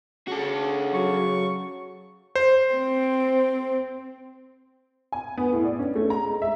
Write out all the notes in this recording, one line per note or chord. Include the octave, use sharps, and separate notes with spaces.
C#3 F#4 A4
F#3 C#6
C5
C4
G#5
B3
A2
D5
C#4
A3
A#5
G#3
E5